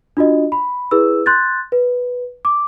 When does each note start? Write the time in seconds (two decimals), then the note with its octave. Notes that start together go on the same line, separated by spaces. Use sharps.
0.17 D4 F4 F#4 D#5
0.52 B5
0.91 E4 G#4 B4 E6
1.26 C6 F#6 G6 A6
1.72 B4
2.45 D6